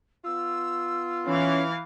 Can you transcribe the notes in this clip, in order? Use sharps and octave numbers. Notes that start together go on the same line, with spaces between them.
B3 F4 E6
E3 C#4 F5